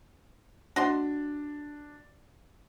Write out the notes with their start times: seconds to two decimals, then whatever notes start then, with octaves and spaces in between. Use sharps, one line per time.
0.76 D4 F#4 D#5 C6